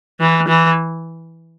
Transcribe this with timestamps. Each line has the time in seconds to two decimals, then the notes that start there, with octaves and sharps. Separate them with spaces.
0.20 E3
0.48 E3